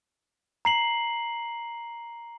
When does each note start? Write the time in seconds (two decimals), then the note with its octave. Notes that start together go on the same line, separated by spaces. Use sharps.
0.65 A#5 C7 F#7